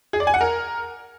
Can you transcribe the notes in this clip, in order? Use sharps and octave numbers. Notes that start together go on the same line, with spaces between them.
G#4
D5
G#5
F#5
A#4